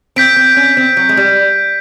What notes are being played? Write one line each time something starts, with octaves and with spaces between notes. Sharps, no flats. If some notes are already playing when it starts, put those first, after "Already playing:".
C4 G6 B6 D7
C4
C#4
C4
F#3
G#3
G3